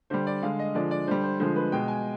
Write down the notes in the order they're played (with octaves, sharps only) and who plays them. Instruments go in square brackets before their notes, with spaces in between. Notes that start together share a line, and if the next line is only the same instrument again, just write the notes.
[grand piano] D3 G3 C5
D5
D3 G#3 F5
D#5
D3 F3 G#3 D5
D5
D3 G3 C5
C5
D3 F3 G#3 C5
B4
B2 G#3 G5
G#5